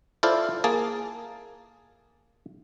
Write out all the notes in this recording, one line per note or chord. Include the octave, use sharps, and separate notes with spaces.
E4 F4 A4 C5 D5 F5
A#3 G#4 A5